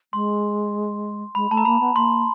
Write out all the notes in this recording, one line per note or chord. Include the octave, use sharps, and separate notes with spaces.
G#3 C6
G#3 B5
A3 A5
A#5
A#3 B5
B3
A#3 C6